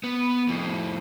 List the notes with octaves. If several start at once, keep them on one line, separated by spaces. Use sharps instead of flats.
B3
F2 A2